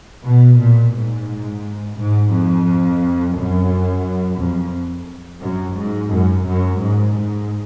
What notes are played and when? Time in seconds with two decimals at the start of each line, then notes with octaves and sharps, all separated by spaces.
0.25 B2
0.59 A#2
0.94 G#2
1.97 G#2
2.31 F2
3.35 F#2
4.39 F2
5.42 F#2
5.77 G#2
6.12 F#2
6.46 F#2
6.80 G#2
7.14 G#2